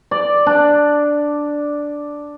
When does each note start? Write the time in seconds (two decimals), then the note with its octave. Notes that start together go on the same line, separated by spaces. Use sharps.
0.11 D5
0.46 D4